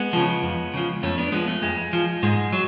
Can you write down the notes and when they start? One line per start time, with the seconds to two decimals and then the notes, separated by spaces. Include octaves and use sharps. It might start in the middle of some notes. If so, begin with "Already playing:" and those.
Already playing: G#3 B3
0.13 C#3 F3
0.42 F2
0.74 C#3 F3
1.03 F2 A3 C#4
1.18 B3 D4
1.32 F3 G#3 B3
1.48 A3
1.62 F2 G#3
1.93 F3
2.23 G#2 G#3
2.52 F#3